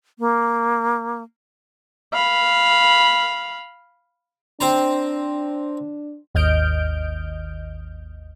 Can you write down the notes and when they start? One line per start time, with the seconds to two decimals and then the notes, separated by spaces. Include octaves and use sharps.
0.19 A#3
2.14 F5 B5
4.61 C4 D4 C5 A#5
6.35 G#1 D#2 D#5 F6 G6 D7